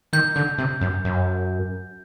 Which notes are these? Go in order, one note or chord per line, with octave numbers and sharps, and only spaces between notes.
D#3 G6
D3
C3
F#2
F#2